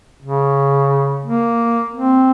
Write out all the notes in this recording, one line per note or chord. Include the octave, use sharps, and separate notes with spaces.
C#3
A#3
C4